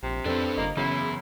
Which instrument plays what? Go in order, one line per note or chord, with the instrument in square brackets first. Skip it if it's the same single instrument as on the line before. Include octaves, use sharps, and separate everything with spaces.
[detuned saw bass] A#1 [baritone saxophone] C3
[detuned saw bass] F2 [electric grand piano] C4 A4 [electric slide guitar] D4 B4
[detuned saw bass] G1 [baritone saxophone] A#3 [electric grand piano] D#5
[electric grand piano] F#2 C7 [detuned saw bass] C#3 [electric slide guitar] E3 B3 [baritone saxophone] E4